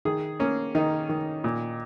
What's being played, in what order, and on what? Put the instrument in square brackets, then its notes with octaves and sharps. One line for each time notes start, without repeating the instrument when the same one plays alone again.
[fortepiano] D#3 G#4
A#3 C#4
D#3 D#4
D#3
A#2